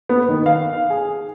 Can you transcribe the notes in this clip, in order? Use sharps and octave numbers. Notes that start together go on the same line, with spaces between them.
B3
D#3
F5
G#4